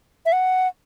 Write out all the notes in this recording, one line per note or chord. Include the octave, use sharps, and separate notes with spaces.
E5
F#5